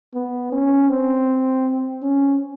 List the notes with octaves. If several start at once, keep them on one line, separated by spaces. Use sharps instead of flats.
B3
C#4
C4
C#4